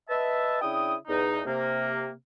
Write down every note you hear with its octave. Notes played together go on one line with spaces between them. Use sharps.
B4 D#5 E5 A5
C#3 D4 E4 G5 D#6
E2 D#4
C3 A#3